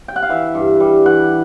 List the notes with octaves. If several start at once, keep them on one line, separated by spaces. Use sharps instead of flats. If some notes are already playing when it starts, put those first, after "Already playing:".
G5
F#5
F5
E3 E5
G2
G3
E3 F#5